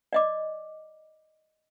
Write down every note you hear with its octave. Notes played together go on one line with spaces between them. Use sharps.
D5 D#5 D6